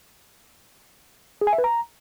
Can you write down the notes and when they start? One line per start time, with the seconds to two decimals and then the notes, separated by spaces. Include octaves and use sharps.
1.41 G#4
1.47 G#5
1.53 E5
1.58 B4
1.64 A#5